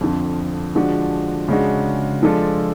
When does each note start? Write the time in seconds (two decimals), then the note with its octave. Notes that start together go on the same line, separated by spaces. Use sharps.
0.01 F2 D3 F3
0.75 D3 F3 G#3 D4 F#4
1.48 C#3 G#3 D4 F#4
2.23 F3 G#3 D4 F4 A4